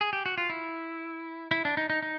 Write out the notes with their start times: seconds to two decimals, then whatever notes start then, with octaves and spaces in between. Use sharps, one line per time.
0.01 G#4
0.13 G4
0.26 F#4
0.38 F4
0.50 E4
1.51 E4
1.65 D4
1.77 D#4
1.90 D#4
2.03 D#4